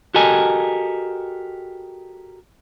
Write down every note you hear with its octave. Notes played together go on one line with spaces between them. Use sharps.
F#4 G4 A4 A#4 D#5 G#5